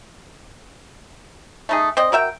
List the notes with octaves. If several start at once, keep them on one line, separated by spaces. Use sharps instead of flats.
A3 D#4 G#4
C4 D5 D#5
F#4 A#4 E5 G5